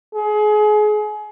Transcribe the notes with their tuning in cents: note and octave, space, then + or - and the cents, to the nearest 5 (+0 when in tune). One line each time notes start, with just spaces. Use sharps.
G#4 +30